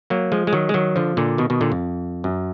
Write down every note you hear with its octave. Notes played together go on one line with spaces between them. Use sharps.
F#3 A#3
F3 G#3
G#3
D#3 F#3
G#3
D#3 F#3
D3 F3
A#2 D3
B2 D#3
B2 D#3
A#2 D3
F2
F#2